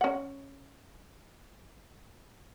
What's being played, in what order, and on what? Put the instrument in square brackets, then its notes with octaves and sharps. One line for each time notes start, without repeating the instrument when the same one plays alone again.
[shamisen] C#4 F#5